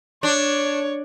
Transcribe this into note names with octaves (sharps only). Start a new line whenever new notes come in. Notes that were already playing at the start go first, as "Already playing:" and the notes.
D4 C#5